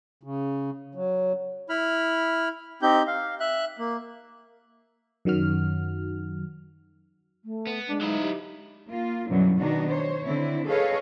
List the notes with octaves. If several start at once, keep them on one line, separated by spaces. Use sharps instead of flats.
C#3
F#3
E4 B5 F6
C4 D#4 G4 G6
F5
E5 F#6
A#3
F#2 D#3 F#3 F#4 F6
A3
B3
G#3 D4
F#3 D#4 E4
G4
A#3 F4
F#2 B2 D3 E3 F#3 G3
B2 D#3 B3 D4 D#4 F#4
C5 C#5
D3 C4 D4 E4
G#4 A4 B4 C#5 D#5 F5